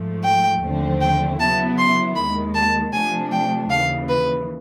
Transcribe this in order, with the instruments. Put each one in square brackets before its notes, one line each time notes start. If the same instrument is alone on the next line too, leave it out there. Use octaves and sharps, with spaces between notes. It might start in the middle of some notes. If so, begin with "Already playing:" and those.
Already playing: [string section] G#2 F3 A3
[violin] G5
[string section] D#2 D3 F3 A3 C4
[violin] G5
[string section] C#3 F#3 B3 E4 [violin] A5
[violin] C6
[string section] D#2 D#3 G#3 [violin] B5
[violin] A5
[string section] C3 F3 A3 D4 [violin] G#5
[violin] G5
[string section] D#2 C#3 E3 [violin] F5
[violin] B4